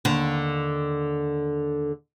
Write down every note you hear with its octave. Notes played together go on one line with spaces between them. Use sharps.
D#2 D3